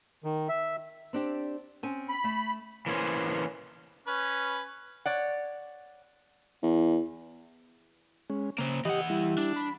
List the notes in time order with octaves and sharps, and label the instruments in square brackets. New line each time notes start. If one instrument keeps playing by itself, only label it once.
[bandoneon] D#3
E5
[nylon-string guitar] C4 D4 G4
C4 C#4 G#5
[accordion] B5
[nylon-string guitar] A3
[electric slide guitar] E3 A#3 C#4 C5
[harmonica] C#4 B4
[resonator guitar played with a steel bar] C#5 D5 F#5
[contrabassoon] E2
[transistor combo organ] G#3 C#4
[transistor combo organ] C#3 [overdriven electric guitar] A#3 C5
[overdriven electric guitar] E3 F#5 [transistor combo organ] G4 D#5
[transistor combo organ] G3 E4
[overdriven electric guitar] D4
[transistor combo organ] B5